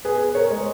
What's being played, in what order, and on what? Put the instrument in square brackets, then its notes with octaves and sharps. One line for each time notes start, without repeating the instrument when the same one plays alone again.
[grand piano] B3 G#4 B4
A#4 C#5
G#3